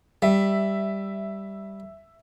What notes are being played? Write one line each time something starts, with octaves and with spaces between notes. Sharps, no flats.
G3 E5